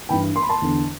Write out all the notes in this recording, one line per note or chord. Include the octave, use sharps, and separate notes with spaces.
G2 E3 G5 B5
C6
B5
A5 C6
E2 D3